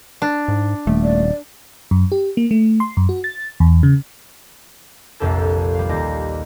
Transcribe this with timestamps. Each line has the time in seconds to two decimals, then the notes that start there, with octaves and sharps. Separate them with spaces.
0.22 D4
0.48 G#2
0.87 D#1 A3
1.03 D5
1.91 F#2
2.12 G4
2.37 A#3
2.51 A3
2.80 C6
2.97 F#2
3.09 F#4
3.24 A6
3.60 E2
3.83 C#3
5.20 F1 A#1 F2 G4 A4 A6
5.75 G3 F5
5.89 D#2 G4 A#6